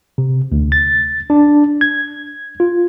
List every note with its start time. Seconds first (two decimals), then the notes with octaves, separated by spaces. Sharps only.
0.18 C3
0.52 D2
0.72 A6
1.30 D4
1.81 G#6
2.60 F4